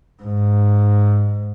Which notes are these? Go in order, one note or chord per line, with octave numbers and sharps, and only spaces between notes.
G#2